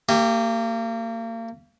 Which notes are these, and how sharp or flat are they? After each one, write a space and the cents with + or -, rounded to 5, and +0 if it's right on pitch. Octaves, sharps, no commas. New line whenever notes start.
A#3 -35 G4 +0